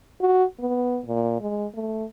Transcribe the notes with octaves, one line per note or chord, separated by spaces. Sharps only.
F#4
B3
A#2
G#3
A3